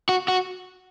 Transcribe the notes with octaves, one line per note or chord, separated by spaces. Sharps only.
F#4
F#4